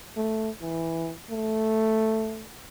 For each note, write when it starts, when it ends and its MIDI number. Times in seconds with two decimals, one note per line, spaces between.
0.17 0.50 57
0.61 1.13 52
1.30 2.48 57